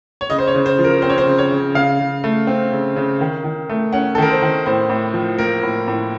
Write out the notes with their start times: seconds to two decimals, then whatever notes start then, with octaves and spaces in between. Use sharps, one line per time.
0.21 C#5
0.30 C#3 D#5
0.39 C5
0.47 C#5
0.54 C#3
0.66 C5
0.79 F3
0.84 A#4
1.02 C4 C5
1.10 C#5
1.18 C5
1.26 C#3
1.38 C#5
1.51 C#3
1.74 C#3 F5
1.99 C#3
2.24 A3
2.47 C4
2.72 C#3
2.96 C#3
3.21 D#3
3.44 D#3
3.70 A3
3.93 C#4 F#5
4.15 A4
4.18 D#3 A#4
4.30 C5
4.42 D#3
4.66 A2 C5
4.90 A2
5.14 F3
5.38 A#3 A#4
5.63 A2
5.88 A2